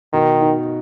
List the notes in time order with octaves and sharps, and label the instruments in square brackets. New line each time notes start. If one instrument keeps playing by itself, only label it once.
[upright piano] B2 [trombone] D#3
[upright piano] D#4